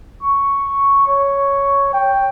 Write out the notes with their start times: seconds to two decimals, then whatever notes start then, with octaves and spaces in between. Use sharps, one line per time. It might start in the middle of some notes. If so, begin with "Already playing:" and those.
0.23 C#6
1.07 C#5
1.93 G5